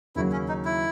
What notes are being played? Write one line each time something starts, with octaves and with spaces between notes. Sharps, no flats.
D#2 C#3 F#3 E4
C#4
D#4
E4